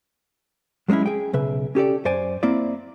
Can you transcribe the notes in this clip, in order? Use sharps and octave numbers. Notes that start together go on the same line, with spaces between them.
F#3 G#3 C4 C#4 E4
G#4 G5
B1 C#3 B4 E5
C#4 G4 A4 D5
F#2 C5 D5 G#5
A#3 C4 E4 D5